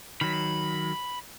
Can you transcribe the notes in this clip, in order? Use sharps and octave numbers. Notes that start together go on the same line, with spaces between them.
D#3 F#3 B5